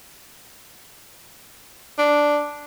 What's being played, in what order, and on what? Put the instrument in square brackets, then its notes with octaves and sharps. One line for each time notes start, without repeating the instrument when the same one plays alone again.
[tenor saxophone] D4